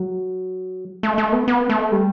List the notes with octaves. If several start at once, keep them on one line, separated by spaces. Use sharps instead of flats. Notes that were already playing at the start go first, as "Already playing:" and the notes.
Already playing: F#3
A3
A3
B3
B3
A3
G3